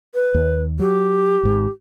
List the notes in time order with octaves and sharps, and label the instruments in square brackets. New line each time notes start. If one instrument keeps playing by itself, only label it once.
[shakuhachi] B4
[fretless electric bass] D#2
[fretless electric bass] F#3 [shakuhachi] G4
[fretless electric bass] G#1 G#2